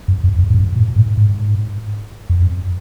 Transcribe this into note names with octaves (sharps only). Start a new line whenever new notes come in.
F#2
F2
F2
G#2
F#2
A#2
G#2
G#2
F2
F#2